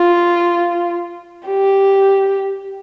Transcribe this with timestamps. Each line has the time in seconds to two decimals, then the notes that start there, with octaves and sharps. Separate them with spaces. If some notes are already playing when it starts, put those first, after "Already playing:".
Already playing: F4
1.47 G4